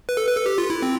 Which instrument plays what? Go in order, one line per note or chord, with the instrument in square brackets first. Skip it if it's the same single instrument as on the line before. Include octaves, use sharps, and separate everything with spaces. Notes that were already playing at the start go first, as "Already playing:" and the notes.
[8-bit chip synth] B4
A4
B4
A4
G4
F4
E4
C4